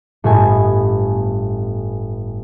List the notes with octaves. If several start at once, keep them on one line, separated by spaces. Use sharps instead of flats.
G1 A2 B3 G#5